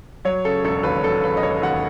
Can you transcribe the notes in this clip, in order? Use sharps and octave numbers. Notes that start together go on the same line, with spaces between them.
F#3 C#5
C#3 A4
E1 A4
D#2 B4
F#3 A4
C#3 B4
D#5
E1 C#5
D#2 F#5